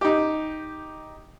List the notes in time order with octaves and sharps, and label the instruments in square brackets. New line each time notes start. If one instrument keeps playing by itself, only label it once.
[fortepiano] D#4 G4